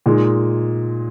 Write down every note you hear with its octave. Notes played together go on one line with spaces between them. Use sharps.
A#2 G#3 D#4